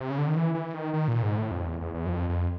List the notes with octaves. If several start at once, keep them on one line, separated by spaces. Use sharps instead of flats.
C3
C#3
D3
D#3
E3
E3
D#3
D#3
A#2
G#2
A2
F2
E2
E2
E2
F#2
F2
F2